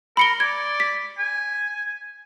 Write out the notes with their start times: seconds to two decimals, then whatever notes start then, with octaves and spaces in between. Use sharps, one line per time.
0.17 A#4 B5 C#7 G7
0.40 D5 G#6
0.80 B6
1.18 G#5